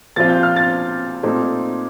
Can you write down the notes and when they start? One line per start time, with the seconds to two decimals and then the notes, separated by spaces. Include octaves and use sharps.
0.16 A#2 F3 C4 F4 A6
0.29 G6
0.43 F6
0.56 A6
1.23 A#2 A3 C4 D#4